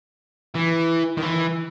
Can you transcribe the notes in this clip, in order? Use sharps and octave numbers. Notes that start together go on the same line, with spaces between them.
E3
D#3
E3